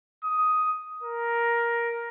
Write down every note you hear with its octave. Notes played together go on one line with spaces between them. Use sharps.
D#6
A#4